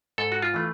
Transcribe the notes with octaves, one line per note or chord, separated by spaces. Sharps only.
G#2 A4
F#4
F4
E3 A3